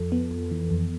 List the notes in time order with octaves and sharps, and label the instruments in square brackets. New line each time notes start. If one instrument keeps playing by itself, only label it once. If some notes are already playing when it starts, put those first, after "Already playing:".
Already playing: [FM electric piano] F2 F3 A4
B3
F2
E3
F2